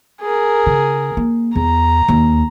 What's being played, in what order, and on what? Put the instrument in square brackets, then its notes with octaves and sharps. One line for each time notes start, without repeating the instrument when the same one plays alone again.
[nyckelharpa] G#4 A#4
[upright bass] C#3
A#3
[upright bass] E2 [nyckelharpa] A#5
[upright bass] D#2